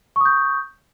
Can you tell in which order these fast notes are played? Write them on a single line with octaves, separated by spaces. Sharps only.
C#6 D#6 G6